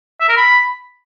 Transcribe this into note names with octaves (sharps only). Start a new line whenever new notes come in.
E5
A#4
B5